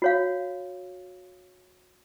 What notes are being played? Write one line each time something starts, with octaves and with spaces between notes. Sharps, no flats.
F#4 C#5 F5